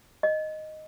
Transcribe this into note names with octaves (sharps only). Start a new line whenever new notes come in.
D#5